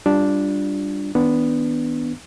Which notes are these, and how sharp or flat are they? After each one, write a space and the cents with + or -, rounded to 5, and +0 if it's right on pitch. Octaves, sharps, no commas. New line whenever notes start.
G3 +0 D4 +0 F4 +0
D#3 +20 B3 +0 D4 -5